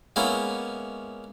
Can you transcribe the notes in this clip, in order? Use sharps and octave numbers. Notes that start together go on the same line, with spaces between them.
G#3 A#3 B3 C#4 E4